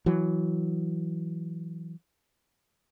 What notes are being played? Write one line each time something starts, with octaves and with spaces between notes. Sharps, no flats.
E3 F#3